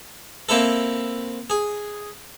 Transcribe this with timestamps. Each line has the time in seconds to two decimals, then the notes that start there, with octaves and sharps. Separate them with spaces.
0.49 A#3 C4 E4 A4
1.50 G#4